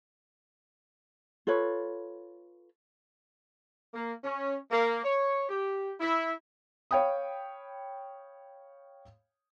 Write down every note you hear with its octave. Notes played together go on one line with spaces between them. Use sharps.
F4 A4 B4 C#5
A#3
C#4
A#3
C#5
G4
E4
C#5 F5 G5 B5 D#6